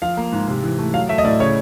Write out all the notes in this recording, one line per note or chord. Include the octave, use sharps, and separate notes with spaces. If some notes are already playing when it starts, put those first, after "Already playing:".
F3 F5
A#3
G#2
C3
E3
A3
F#3 F5
A3 E5
D#5
A2 D5
C#3 C#5